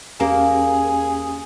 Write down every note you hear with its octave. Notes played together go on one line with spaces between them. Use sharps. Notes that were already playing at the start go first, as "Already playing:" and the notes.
E2 A#3 C#4 G4 G#4